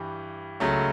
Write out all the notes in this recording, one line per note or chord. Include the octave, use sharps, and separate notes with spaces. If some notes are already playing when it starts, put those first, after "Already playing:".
Already playing: G2 E3 G3
C#2 C#3 F#3 A3